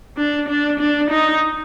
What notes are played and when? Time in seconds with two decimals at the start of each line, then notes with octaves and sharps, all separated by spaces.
0.17 D4
0.48 D4
0.79 D4
1.10 D#4